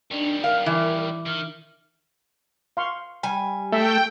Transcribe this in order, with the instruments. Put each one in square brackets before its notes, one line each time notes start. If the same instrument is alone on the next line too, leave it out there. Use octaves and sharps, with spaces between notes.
[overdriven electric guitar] D#3 G3 [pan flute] D4
[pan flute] A#4 [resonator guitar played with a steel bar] F5
[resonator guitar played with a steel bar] E3
[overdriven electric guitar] D#3 [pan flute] F6
[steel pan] F5 C6 C#6
[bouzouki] G3 G#5
[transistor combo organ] A3 [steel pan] E5 [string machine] G5